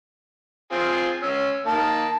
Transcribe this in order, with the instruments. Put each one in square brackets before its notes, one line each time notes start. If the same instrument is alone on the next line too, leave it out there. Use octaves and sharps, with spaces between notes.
[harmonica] C4 F4 G#4
C#4 E6
[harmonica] D#3 A#3 [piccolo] A5